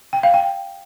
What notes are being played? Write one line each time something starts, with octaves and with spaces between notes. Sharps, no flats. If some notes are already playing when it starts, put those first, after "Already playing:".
G5
F5
G5